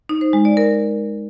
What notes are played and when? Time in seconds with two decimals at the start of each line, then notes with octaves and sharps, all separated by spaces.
0.09 D#4
0.21 C5
0.33 G#3
0.45 D5
0.57 A#4